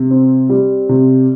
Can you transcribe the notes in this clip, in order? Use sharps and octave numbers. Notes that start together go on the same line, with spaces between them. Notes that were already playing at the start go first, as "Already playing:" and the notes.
Already playing: C3
C4
G3
C3